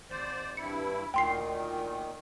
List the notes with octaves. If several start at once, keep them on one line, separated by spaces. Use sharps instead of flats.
G#1 C5 D5
G2 E4 C#7
D2 A#2 D#3 G5 C6 C7